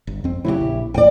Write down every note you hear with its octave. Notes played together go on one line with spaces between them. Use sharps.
G1
F2 C4
C#3 F3 F#3 E4 G4
A#1
A1 E2 D5 G5